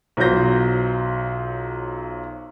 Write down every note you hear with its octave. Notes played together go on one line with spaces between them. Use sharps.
B1 F#3 F4 C5 G6 A#6